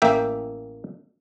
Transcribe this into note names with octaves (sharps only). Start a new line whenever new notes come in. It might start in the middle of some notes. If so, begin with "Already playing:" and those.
A1 A#3 E5 G5